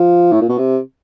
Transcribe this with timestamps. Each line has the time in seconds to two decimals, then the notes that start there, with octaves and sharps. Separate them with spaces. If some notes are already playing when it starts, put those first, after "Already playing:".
Already playing: F3
0.32 A2
0.41 A#2
0.49 B2
0.58 C3